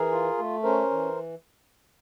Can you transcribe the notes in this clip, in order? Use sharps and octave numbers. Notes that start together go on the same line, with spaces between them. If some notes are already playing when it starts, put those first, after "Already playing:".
Already playing: E3 G#4 A#4
F4
A3
C#4 A#4 C5
E3